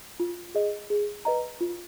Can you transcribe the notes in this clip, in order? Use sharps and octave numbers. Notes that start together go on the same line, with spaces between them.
F4
G#4 D#5
G#4
B4 D#5 A#5
F4